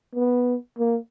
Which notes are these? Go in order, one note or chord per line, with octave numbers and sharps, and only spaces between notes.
B3
A#3